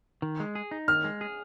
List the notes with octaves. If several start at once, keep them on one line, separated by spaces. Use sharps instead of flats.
D#3
G#3
G#4
D#4
D#3 F6
G#3
G#4